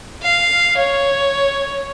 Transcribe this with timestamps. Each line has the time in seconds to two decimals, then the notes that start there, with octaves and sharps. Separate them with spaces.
0.22 F5
0.77 C#5